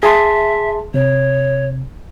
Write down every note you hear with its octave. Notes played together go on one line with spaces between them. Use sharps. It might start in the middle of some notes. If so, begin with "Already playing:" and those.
G#4 E5 A5 C6
C3 C#5